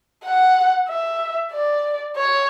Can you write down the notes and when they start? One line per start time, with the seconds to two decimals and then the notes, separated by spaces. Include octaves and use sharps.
0.24 F#5
0.89 E5
1.52 D5
2.17 C#5